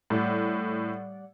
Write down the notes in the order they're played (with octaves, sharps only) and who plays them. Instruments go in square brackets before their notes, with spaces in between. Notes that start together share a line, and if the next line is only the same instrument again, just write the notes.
[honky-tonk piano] A2 [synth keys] G3 D5 F#5